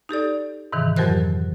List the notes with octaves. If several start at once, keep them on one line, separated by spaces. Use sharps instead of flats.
D#4 G4 A4 D5
G#2 C3 D#3 E3
F2 F#3 G4 A#4 C5 F#6